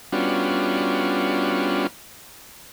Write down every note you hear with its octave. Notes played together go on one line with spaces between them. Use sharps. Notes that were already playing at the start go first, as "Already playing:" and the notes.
G3 B3 C#4 D4 F4 F#4